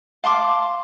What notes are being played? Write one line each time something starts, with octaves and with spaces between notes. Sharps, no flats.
F5 A5 C6 D6